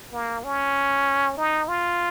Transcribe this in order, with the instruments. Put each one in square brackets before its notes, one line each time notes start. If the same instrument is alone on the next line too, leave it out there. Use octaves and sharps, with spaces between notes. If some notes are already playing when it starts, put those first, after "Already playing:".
[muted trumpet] A#3
C#4
D#4
F4